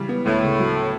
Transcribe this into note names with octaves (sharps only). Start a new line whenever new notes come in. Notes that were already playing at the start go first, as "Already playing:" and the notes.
Already playing: C#3 E3 G3
B3
D2 A2
C#3
F#3